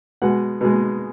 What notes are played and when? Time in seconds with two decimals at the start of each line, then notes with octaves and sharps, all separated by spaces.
0.22 B2 G#3 F#5
0.61 B2 G#3